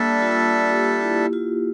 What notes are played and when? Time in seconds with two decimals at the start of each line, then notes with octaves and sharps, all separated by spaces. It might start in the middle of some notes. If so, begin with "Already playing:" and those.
Already playing: G3 A#3 D4 A4 E5
0.22 F4
0.69 G4
1.01 E4
1.33 F4